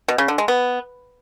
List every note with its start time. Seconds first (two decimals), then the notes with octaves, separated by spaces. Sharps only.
0.08 B2
0.18 C#3
0.28 D3
0.38 G#3
0.48 B3